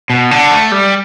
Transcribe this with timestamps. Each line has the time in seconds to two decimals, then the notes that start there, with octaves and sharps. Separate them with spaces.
0.10 B2
0.31 D3
0.51 A3
0.72 G3